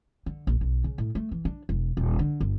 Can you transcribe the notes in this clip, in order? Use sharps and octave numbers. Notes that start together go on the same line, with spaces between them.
D3
A#1
B1
C#3
A2
A3
E3
D4
E1
D#1
D3
G1